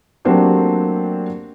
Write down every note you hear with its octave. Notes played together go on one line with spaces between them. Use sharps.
F#3 A3 A#3 C4 D4 G4